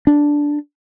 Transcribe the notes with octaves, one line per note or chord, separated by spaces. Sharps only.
D4